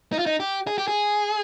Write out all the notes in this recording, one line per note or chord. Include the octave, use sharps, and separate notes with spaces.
D#4
F4
D#4
G4
G#4
G4
G#4